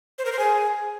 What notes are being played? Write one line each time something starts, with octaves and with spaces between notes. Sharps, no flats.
C5
A#4
C5
G#4